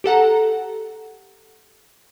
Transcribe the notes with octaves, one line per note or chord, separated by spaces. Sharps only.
G4 A4 F#5 A#5